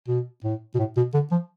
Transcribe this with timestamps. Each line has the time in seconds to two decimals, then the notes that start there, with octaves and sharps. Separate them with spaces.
0.08 B2
0.44 A2
0.75 B2
0.79 A2
0.97 B2
1.14 D3
1.31 F3